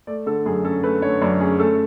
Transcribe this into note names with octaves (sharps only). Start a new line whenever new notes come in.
A3 D5
D3 A4
F#2 G#4
C#4 A4
A3 B4
D3 C#5
F#2 D5
C#4 G#4
A3 A4